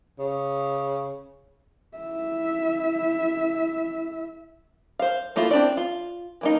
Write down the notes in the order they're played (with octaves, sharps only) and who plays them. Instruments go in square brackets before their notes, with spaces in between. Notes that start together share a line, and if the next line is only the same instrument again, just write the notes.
[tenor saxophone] C#3
[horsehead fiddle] E4 E5
[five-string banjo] C5 F5
A3 A#3 E4 F4
C4 D4 E4 D5
F4
E3 A#3 D#4